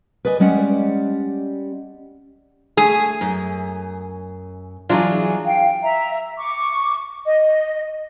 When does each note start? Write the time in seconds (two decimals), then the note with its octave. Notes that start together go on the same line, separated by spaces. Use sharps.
0.25 B4 D5 D#5 G#5
0.40 G3 G#3 C#4 D5 F#5
2.77 A3 G#4
3.21 F#2
4.89 E3 F#3 D4 F4 G#4
5.44 F5 G5
5.83 E5 A#5
6.38 C#6 D6
7.26 D#5